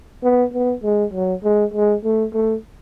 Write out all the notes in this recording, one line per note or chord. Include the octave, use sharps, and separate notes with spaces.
B3
B3
G#3
F#3
G#3
G#3
A3
A3